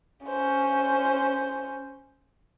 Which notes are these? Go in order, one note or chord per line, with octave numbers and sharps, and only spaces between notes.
C#4 C5